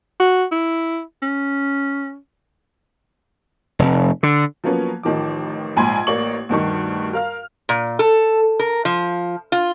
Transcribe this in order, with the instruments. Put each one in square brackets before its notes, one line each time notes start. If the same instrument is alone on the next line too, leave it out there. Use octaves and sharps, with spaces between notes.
[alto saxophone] F#4
E4
C#4
[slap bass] F1
D3
[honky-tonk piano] F3 F#3 A#3 B3 C#4
A1 D#3 F3 D6
A#1 G#2 G#5 B5 C6 G#6
A1 A#3 D5 C#6 F#7
D2 G2 D#3 C#6
A#4 F5 F6
[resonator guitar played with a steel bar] A#2
A4
A#4
F3
F4